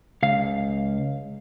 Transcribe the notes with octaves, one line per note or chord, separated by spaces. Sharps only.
C#2 F5